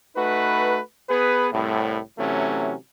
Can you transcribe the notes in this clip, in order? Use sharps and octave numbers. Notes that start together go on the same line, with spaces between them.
A3 D#4 F#4 B4
B3 G#4 B4
C2 A2
C3 E3 F#3 A3 C#4